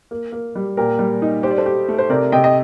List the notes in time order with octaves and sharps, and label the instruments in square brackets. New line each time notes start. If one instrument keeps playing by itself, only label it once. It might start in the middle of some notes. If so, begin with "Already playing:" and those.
[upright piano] A#3
A#3
G3
[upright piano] A#2 [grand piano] G4 A#4
[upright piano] G3
D#4
[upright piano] G4 [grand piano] C5
[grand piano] D5
A4 C5
[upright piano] G4
A3
[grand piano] C5
[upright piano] C3 [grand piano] A#4 D5
[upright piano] C3 [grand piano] D#5 G5
[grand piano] D#5